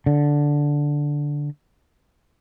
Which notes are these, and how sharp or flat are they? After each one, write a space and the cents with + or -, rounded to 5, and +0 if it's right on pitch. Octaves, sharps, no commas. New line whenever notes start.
D3 -5